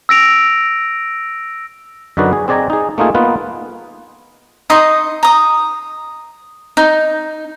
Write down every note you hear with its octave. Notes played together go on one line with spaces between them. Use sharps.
E6 A#6 D7 F7
F#2 D3 D#4 F#4 B4 D5
G#4
C4 G#4 D5 D#5 G#5 A#5
D#4 G#4
A3 A#3 D#4 F4 G#4
A#3 B3 D#4 F4 B4
D#4 D#5 C6
A#5 D#6
D#4